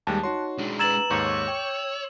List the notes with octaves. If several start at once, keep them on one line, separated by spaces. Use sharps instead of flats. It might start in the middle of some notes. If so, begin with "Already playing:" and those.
D#2 G3 G#3 A5 F#6
D#4 F#4 C#5 C6
G#3 D4
B4 A#5 E6 G#6 A6 E7 F#7
D#2 G#2 C#5 C#6 D6 G6
G5